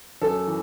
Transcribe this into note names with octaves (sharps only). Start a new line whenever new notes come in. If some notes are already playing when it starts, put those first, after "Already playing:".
F#2 A4
E3